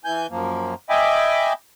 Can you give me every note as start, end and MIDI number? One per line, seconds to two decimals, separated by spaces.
0.05 0.27 52
0.05 0.27 80
0.05 0.27 91
0.30 0.74 42
0.30 0.74 53
0.30 0.74 58
0.90 1.53 75
0.90 1.53 76
0.90 1.53 79
0.90 1.53 80
0.90 1.53 83
0.90 1.53 86